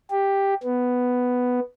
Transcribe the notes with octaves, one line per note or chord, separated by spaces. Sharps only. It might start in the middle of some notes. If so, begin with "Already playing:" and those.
G4
B3